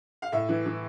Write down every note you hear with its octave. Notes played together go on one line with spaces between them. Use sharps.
F5
A2 E5
E3
E3